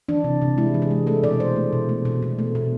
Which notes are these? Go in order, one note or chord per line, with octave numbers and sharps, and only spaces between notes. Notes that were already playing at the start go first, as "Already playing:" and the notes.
E3 D4
C3
C3
G#3 E4
E3
G#4
G#3
A3 A4
B2 D5
B2 C5
A3
B2
A3
B2
B2
A3
B2